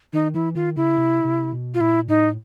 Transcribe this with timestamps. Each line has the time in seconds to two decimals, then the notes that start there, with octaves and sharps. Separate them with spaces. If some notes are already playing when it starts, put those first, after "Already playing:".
0.13 D#3 D#4
0.34 E3 E4
0.55 D#3 F4
0.76 C#3 E4
0.97 C3
1.24 C3
1.53 B2
1.74 F4
1.80 A#2 E4
2.08 A2 D#4